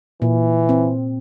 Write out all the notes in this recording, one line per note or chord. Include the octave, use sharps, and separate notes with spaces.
A#2 E3
C4